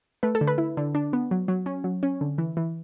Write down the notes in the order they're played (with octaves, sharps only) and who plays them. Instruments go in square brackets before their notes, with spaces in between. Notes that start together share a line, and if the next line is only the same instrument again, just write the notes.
[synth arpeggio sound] A3 B4
A4
D3
B4
E4
D3
D4
B3
F#3
F#3
C#4
F#3
C#4
D3
E3
E3